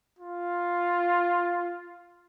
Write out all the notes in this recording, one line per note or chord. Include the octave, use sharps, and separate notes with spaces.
F4